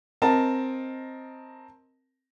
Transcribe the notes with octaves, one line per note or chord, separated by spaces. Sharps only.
C4 A#4 D#5 A5